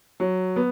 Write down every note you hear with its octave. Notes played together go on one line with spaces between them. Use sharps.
F#3
B3